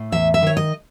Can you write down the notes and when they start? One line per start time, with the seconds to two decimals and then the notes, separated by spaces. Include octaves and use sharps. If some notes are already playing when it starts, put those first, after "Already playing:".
Already playing: A2
0.12 E2 E5
0.34 E5
0.43 D#3 C#5
0.57 D#5